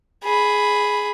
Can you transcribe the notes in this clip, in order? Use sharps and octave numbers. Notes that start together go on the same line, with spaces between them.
G#4 B5